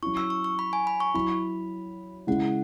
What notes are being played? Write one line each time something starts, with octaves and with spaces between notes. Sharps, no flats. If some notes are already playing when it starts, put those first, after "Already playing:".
F#3 C#4 E4 C#6
E6
C#6
C#6
B5
G#5
B5
C#6
F#3 E4 B5
C#3 G#3 E4 F#5